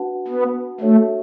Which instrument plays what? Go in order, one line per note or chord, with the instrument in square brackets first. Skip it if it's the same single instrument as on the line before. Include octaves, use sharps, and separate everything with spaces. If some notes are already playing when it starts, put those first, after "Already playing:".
Already playing: [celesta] D4 F#4 B4 F#5 A5
[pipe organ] B3
[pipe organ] A3 [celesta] D4 F#4 A4 C#5 E5